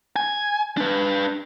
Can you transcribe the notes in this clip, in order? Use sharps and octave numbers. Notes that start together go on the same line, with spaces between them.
G#5
D4 B4